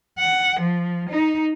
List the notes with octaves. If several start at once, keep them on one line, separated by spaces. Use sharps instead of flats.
F#5
F3
D#4